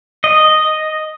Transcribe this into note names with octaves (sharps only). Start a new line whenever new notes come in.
D#5